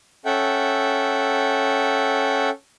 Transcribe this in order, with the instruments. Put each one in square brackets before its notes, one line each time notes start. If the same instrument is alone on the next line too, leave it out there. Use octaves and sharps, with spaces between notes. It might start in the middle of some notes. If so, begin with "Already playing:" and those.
[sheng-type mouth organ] C#4 A4 E5 F#5 G5